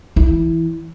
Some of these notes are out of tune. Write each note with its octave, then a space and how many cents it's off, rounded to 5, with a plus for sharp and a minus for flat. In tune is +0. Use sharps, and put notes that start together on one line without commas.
E3 +0 E4 -10